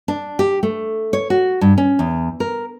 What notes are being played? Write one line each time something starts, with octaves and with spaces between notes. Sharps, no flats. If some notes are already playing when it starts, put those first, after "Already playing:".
D4
G4
A3
C#5
F#4
G2
C#4
E2
A#4